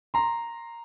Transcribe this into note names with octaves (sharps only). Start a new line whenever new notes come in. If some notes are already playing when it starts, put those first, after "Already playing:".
A#5 C6